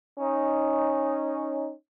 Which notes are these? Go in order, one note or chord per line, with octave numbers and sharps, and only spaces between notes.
C#4 D#4